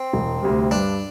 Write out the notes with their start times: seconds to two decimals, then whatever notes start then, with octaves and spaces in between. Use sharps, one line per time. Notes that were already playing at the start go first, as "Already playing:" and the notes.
Already playing: C4
0.13 E1
0.42 D2 C3 G3
0.71 G2 D4